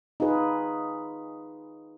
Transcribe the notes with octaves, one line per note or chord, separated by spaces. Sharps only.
D#4 F4 G#4 B4